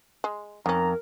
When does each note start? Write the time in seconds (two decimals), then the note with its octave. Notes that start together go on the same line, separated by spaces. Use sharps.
0.24 G#3
0.66 F2 D#3 C#4 A#4 A#5